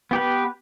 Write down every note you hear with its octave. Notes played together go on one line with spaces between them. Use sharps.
B3 G4 B4